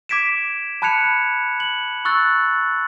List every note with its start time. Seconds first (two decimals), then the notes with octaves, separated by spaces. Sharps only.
0.09 D6 G#6 B6 D7 E7
0.82 A5 B5 F#6 G#6 C#7 F7
1.60 F#7
2.05 C#6 E6 F#6 A6